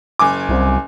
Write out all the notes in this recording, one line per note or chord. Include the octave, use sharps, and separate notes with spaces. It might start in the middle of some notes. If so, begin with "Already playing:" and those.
F#1 G#5 D6
C2